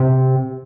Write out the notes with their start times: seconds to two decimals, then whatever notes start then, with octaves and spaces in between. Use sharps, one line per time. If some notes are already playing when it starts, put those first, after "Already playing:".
Already playing: C3